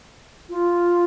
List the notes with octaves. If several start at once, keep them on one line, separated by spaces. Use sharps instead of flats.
F4